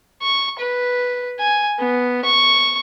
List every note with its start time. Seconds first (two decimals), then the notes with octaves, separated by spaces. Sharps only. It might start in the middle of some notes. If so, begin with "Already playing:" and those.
0.22 C#6
0.59 B4
1.39 G#5
1.79 B3
2.25 C#6